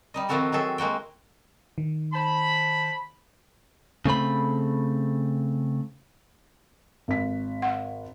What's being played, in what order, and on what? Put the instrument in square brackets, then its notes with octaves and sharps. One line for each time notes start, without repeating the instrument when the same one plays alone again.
[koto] G3 D#4 D#5
D#3 F3 C4 F#4 A4 A#4
D#3 F#3 G#4 A4 E5
G#3 A#3 F#4 G5
[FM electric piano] D#3
[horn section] C5 A5 B5
[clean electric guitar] C#3 A3 C4 B5
[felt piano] G#1 B6
[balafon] F#5